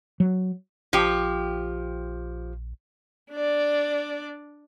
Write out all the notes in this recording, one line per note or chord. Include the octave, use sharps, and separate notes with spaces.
F#3
A#1 F3 G4
D4 D5